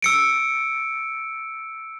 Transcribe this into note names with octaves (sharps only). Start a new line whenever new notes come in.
E6 C#7 D7